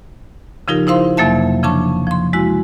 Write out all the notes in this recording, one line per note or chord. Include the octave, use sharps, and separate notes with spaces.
C#3 F3 D#4 F4 G4 A#4
D#4 E4 C5 F5 C6
F2 C3 F#3 A#3 E5 A5
C#3 F3 D4 A5 C#6
F3 C6
G#3 E4 F#4